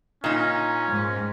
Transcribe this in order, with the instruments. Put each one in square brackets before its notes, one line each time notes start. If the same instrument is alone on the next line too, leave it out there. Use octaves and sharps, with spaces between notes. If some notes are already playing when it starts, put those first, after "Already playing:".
[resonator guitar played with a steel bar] A#2 D#4 [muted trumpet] C#4
[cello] G#2